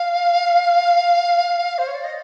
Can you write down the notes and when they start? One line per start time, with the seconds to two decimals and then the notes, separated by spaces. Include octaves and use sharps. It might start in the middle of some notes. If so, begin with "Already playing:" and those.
Already playing: F5
1.78 C5
1.87 C#5
1.94 D5
2.03 D#5